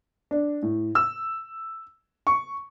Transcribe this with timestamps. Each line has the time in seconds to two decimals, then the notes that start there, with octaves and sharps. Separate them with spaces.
0.31 D4
0.63 A2
0.95 E6
2.27 C#6